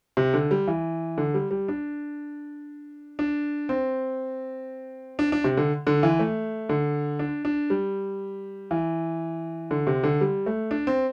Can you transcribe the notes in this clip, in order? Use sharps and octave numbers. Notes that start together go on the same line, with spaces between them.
C3
D3
G3
E3
D3
G3
G3
D4
D4
C4
D4
D4
C3
D3
D3
E3
A3
D3
D4
D4
G3
E3
D3
C3
D3
G3
A3
D4
C4